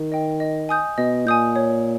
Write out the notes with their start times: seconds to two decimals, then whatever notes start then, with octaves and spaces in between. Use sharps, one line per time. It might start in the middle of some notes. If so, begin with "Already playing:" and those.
Already playing: D#3
0.12 D#5 G5
0.40 D#5
0.69 G#5 D#6 G6
0.98 B2 D#5
1.26 A#2 G#5 D#6 G6
1.56 C#5